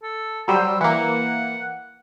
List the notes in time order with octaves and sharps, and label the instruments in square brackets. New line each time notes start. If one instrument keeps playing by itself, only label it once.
[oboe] A4
[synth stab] F#3 G3 C5 [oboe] E6
[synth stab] E3 A#3 [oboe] F#5